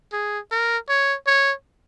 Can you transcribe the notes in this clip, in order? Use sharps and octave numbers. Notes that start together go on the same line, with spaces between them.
G#4
A#4
C#5
C#5